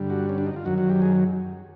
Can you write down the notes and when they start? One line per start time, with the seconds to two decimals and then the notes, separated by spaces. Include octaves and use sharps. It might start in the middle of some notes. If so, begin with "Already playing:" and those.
Already playing: G2 D3 G3
0.10 F#4
0.29 C#4
0.38 D4
0.47 D#4
0.56 F4
0.65 F#2 D#3 F#3 F#4
0.78 F#4
0.90 G4
1.02 G#4